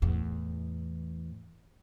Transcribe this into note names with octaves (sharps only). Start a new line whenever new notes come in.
E2 A2